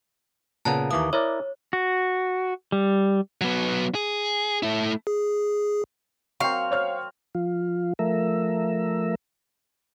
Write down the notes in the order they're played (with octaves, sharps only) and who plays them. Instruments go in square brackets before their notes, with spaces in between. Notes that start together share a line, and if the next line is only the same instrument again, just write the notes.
[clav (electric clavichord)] A#2 C#3 B3 [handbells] A5 A#5 F#6
[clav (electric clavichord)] D#2 E3 A#3 [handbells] D6 D#6
[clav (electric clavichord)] E4 A#4 D5 [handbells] C#5
[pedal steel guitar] F#4
G3
[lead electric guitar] F#3 B3
G#4
A3 E4
[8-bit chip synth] G#4
[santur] F#3 A#3 C4 [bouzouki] F5 [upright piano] C#6
[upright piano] C5 C#5 F6
[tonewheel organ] F3 F4
F3 A3 A#4 E5